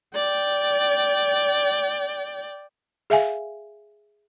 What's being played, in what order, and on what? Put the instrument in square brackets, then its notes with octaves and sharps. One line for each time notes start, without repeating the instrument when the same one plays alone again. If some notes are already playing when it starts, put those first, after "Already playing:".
[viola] D5 G5
[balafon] G#4 E5 F5 G#5